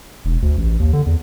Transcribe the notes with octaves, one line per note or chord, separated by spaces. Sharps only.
E1
D2
A1
D#2
D3
E2